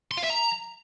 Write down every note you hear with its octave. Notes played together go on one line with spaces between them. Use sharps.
C6
F5
E5
A#5